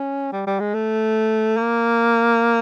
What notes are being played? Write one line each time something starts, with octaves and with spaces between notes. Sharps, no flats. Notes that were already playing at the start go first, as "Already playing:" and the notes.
Already playing: C#4
G3
G3
G#3
A3
A#3